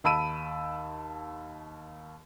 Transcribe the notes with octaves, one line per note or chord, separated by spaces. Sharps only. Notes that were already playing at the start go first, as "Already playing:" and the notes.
D#2 A5 B5 E6 D7 D#7